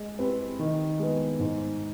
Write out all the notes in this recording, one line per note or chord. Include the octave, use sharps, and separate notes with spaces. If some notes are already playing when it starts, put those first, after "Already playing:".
Already playing: G#3
C4 G4 B4
D#3
G#3 B3
G#2